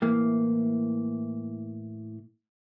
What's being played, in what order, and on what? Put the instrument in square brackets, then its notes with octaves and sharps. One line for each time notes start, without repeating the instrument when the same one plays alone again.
[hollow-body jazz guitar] A2 E3 A#3